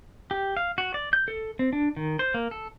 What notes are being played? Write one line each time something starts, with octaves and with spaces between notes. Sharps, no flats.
G4
F5
F#4
D5
G6
A4
C4
D4
D#3
C5
A#3
A4